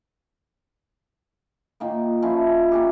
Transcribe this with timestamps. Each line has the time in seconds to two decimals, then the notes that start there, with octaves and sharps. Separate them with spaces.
1.80 A#2 D#3 A#3
2.22 F3 C#4 E4
2.72 A#3 C#4 G4